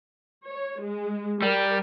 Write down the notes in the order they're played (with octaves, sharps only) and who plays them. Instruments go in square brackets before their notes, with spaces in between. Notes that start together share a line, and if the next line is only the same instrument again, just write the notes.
[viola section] C#5
G#3
[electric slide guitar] G3 [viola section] A#4